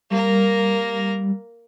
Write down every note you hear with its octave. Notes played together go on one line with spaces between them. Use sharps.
G3 A#3 A#4